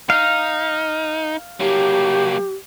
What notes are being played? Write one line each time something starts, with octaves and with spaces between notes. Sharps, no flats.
D#4 F5
F#3 A#3 G4